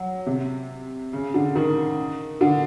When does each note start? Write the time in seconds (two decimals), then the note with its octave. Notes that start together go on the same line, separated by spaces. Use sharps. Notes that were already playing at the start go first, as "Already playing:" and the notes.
Already playing: F#3
0.26 C3
1.13 C#3
1.34 D3
1.55 D#3
2.41 D3